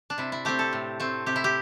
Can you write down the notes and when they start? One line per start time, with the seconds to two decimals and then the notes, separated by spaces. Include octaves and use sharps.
0.10 D4
0.18 C3 E4
0.32 E4
0.45 A3 C4 G4
0.59 A4
0.73 A2
1.00 A3 C4
1.26 C3 G4
1.36 E4
1.44 G4